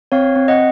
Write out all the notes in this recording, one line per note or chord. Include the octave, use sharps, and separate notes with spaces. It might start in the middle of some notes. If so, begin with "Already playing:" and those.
C4 C#5 F5
C4
D#5 F#5